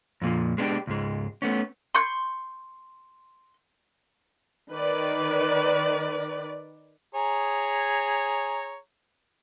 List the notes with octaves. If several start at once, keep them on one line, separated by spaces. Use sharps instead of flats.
F2 A#2 F3
G#3 B3 D4 E4 G4
C#2 G#2 G#3
A3 B3 C#4
C6 C#6 G6
D#3 B4 D5
G#4 C#5 A#5